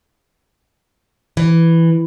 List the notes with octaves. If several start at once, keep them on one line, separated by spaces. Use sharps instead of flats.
E3